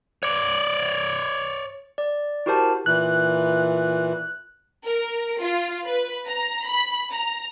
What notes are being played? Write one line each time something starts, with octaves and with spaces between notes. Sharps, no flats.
C#5 D5
D5
E4 F#4 G4 A#4 C5 A5
A#2 E3 F#6
A#4
F4
B4
A#5
B5
A#5